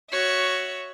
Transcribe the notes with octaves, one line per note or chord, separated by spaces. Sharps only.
F#4 C#5 E5